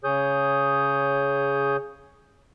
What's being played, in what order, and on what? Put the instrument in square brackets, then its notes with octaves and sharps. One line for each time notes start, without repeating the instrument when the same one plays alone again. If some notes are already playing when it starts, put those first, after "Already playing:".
[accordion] C#3 G#4 C#5 D#6 G6